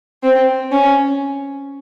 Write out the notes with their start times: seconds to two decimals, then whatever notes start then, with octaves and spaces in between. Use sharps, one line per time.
0.23 C4
0.72 C#4